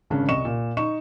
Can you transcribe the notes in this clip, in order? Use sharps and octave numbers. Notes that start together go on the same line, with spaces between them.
G#1 C#3 C#4 D4
C2 D#5 C#6 E7
A#2
D#4 C#6 E7